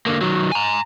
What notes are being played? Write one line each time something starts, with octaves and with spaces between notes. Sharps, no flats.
D3 A#3
D#3 F#3
G#5 A#5